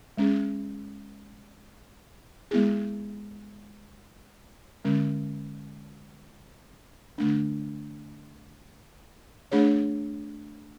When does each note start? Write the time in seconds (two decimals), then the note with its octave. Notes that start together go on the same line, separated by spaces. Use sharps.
0.18 G#3 C#4 G#4
2.51 G#3 B3 E4 G#4
4.85 D3 G#3 C#4
7.18 D3 A3 D4
9.52 A3 D4 G#4 C#5